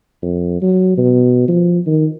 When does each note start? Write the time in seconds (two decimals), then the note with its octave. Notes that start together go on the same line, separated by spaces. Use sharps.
0.22 F2
0.61 F#3
0.97 B2
1.48 F3
1.86 D#3